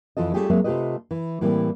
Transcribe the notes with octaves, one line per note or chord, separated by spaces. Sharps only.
F2 E3 F4 A4 D#5
G3 A3 C#4 F4 G4 G#4
F#3 G#3 A#3 C4 G#4 E5
C3 A3 F4 G4 B4 D#5
E3
A2 E3 G3 A#3 C4